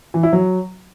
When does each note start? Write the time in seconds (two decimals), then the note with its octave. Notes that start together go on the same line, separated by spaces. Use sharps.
0.14 E3
0.23 E4
0.33 F#3